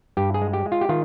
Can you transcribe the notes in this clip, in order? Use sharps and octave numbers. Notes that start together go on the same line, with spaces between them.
G2 G4
G#4
G#3
G4
G#3
F4
G4
D#3 F4